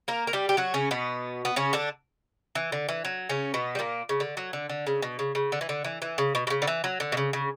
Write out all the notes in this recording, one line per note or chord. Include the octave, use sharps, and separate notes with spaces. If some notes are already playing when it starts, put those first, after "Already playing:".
A#3 A#4
A#4
G3 G4
G4
F#3 F#4
C#3 C#4
B2 B3
B3
C#3 C#4
D3 D4
E3
D3
E3
F#3
C#3 C#4
B2 B3
G3
A#2 A#3
C#3
D3
F#3
D3
D3
C#3
B2
C#3
C#3
D3
E3
D3
E3
E3
C#3
B2
B2
C#3
D3
E3
F#3
D3
B2
C#3
C#3